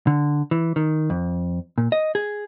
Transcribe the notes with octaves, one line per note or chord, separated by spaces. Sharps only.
D3
E3
D#3
F2
A#2
D#5
G#4